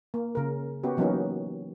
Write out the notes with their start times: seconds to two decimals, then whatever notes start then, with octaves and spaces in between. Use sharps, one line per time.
0.14 A#3
0.35 C#3 A#4
0.83 B3 C#4 F#4 G4
0.97 E3 F#3 A#3 B3 C#4 D#4